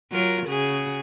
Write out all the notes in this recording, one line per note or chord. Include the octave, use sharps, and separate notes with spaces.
F#3 F4 A#4
C#3 F#4 G#4